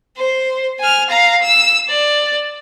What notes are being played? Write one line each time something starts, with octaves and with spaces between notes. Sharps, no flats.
C5
G#5 F6
F5 A#5
E6
D5